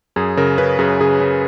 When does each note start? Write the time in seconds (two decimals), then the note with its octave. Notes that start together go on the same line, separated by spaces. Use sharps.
0.16 F#2 G#4
0.37 C#3 A#4
0.58 C#3 B4
0.79 F#2 G#4
1.01 C#3 G#4
1.20 C#3